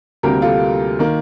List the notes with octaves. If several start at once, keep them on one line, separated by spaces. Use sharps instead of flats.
D2 C3 G3 A#3 G4 A#4
F4 A4
D#3 A#3